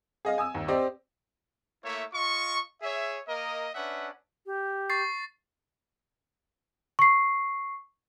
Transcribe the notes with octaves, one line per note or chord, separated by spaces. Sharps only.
G#4 D#5 F5
G#5 D#6 E6
D#2
C4 G4 D5 D#5
A3 A#3 E4 C#5 E5
F4 D#5 C#6
G#4 C#5 E5
A#3 A#4 D#5
C#4 D4 B4 E5 F#5
G4
C#6 A6 C7
C#6 C7